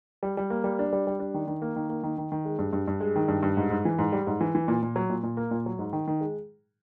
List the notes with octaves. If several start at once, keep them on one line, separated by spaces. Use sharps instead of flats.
G3
G3
A#3
G3
D4
G3
G3
D4
D#3
D#3
A#3
D#3
A#3
D#3
D#3
D#3
G#3
G2
G2
G2
G#3
D#3
G2
G2
G#2
G#2
E3
G#2
G3
G#2
E3
E3
A#2
A#2
F#3
A#2
A#2
A#3
A#2
F#3
G#2
D#3
D#3
G#3